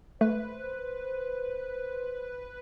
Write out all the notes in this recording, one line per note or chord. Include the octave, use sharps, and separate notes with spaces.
A3 B4 C5